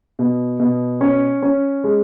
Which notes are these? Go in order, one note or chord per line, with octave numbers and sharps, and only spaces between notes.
B2
B2
C#4
C#4
G#3